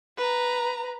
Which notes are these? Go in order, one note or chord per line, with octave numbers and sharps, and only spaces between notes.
B4 A#5